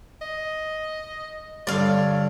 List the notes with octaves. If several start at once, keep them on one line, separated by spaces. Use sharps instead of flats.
D#5
G2 D3 C#5 D5 F5